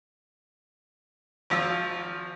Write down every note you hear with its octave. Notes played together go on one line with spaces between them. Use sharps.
G#1 F3 F4 E6